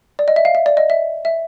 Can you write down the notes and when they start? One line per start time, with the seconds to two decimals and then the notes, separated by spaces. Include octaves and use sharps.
0.19 D5
0.28 D#5
0.36 E5
0.45 F5
0.55 E5
0.66 D5
0.77 D#5
0.90 E5
1.25 E5